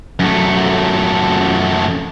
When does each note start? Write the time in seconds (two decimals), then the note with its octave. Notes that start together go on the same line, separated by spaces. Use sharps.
0.20 F#2 A3